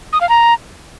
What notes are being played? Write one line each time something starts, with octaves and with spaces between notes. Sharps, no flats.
D#6
F5
A#5